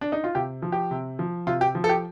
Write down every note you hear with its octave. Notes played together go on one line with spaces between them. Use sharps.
D4
D#4
F4
C3 G4
F3
G4
C3
F3
C3 F4
G4
F3
A4
G4